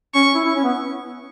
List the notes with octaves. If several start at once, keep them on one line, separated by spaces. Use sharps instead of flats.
C#4 C#6
C#4
E4
E4
C#4
B3